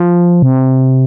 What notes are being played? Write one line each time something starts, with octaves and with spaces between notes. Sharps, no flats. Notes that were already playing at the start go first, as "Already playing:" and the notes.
Already playing: F3
C3